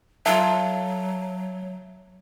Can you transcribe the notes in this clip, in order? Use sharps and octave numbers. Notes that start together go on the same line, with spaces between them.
F#3 F4 A4 E5